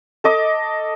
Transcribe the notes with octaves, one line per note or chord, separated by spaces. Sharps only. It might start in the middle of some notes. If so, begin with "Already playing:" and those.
A4 D#5 D6